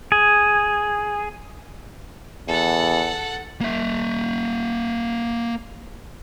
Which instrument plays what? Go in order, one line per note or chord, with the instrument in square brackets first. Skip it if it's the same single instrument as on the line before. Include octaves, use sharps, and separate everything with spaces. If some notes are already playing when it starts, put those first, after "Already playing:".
[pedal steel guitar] G#4
[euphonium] E2 [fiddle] A4 F#5
[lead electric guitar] A#3 E5